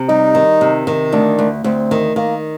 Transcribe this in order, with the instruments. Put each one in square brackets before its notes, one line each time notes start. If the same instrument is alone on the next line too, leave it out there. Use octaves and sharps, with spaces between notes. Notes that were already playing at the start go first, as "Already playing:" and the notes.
Already playing: [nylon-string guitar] C3
[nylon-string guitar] G3 [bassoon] D#4
[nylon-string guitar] D#3
C3
D#3
[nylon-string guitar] D2 [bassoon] D4
[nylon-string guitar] D2
[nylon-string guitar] D2 [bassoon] C4
[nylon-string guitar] D#3
[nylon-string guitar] D#3 [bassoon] A#3